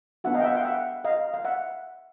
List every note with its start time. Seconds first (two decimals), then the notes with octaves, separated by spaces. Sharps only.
0.24 B3 D4 F#4 E5 F#5
0.34 D#5 F5
0.40 G5
0.44 E5 F#5
0.55 F5 G5
0.65 E5 F#5
1.04 D#5 F5
1.34 F5
1.45 E5 F#5